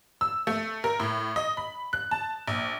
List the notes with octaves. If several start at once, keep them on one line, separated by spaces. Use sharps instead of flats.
E6
A3
A#4
A2
D#5
B5
F#6
A5
A#1